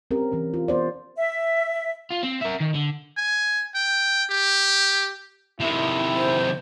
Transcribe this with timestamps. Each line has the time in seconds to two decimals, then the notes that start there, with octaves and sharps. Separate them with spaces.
0.11 C4 C#4 G4 A#4
0.32 E3 C4 C#4
0.54 F4
0.68 B3 C5 D5
1.16 E5
2.10 F4
2.23 C4
2.41 A#4 E5
2.60 D#3
2.74 D3
3.17 G#5
3.75 G5
4.30 G4
5.60 C3 D#3 E4
6.15 C5